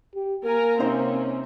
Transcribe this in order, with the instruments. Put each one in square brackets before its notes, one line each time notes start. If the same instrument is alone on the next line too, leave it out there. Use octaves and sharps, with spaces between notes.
[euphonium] G4
[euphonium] A#3 [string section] A#4 G#5 A#5
[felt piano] C3 D#4 C5 [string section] C4 C#4